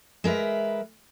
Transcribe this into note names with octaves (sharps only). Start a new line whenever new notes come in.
G#3 A#4 B4 E5